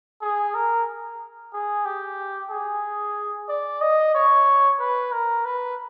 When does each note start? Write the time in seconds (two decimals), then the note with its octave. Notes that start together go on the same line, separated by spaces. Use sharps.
0.22 G#4
0.55 A#4
1.53 G#4
1.85 G4
2.51 G#4
3.49 D5
3.82 D#5
4.15 C#5
4.80 B4
5.12 A#4
5.45 B4